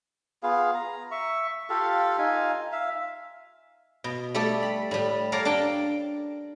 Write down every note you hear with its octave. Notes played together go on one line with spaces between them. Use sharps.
B3 F4 G#4 F5
A#5
E5 C#6
F4 G4 A4 F5
D#4 F4 F5 G#5
E5 F5
B2
G3 A3 A4 D5
B5
A2 G3
A4 A#4 C#5 D5 F5
D4 A#4 G5 A5